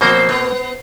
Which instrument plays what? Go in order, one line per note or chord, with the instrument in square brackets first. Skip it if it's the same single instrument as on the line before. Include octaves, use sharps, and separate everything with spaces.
[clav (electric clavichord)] B2 A#3 C4 [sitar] F3 C5
[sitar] B3